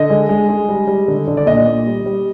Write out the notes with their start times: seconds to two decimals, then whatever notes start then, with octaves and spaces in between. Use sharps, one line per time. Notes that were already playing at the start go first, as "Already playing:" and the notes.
Already playing: D3 D#5
0.10 G#3
0.29 G#3
0.49 G#3
0.69 G3
0.88 G3
1.08 D3
1.28 D3
1.37 D5
1.46 A#2 D#5
1.67 A#2
1.87 G3
2.06 G3